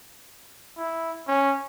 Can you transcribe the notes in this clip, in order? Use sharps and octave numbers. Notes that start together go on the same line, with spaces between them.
E4
C#4